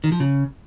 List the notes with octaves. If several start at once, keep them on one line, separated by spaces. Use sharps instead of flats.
D#3
F3
C#3